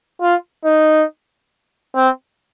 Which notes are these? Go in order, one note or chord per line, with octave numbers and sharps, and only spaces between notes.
F4
D#4
C4